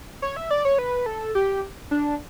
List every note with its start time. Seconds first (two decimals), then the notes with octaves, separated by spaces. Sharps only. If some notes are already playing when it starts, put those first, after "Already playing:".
0.22 C#5
0.36 E5
0.51 D5
0.65 C#5
0.78 B4
1.06 A4
1.35 G4
1.91 D4